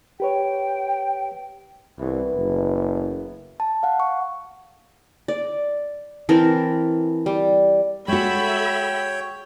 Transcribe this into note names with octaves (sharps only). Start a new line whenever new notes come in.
G4 B4 C#5 G5
C2 E3 B3
F#1
A5
F5 F#5
C#6
D5
E3 C4 A4 A#4
G3
G#3 F#4 A4 C#5 E5 G5 B5